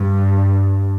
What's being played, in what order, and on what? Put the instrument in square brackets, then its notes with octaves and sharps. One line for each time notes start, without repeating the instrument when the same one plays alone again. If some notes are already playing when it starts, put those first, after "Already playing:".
Already playing: [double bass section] G2